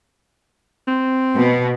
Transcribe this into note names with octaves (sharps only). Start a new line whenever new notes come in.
C4
B2